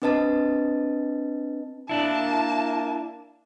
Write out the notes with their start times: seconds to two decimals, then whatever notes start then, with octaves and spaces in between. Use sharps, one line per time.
0.02 C4 D4 B4 D#5 A5 A6
1.89 A#3 D4 E4 A5